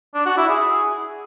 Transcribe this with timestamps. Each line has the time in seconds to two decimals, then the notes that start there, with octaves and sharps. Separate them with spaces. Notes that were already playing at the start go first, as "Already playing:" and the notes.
0.15 D4
0.26 F#4
0.38 E4
0.49 G#4